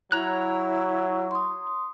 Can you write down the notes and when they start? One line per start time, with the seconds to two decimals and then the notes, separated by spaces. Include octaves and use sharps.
0.12 F#3 E4 C#5 A#5 F#6
1.31 C6 D#6